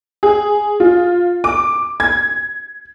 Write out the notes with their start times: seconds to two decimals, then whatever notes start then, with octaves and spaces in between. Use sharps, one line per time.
0.23 G#4
0.80 F4
1.44 D6
2.00 G#6